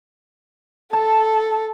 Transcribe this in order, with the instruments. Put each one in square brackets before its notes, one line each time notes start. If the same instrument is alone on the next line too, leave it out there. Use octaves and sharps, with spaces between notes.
[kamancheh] A4 [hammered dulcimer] A5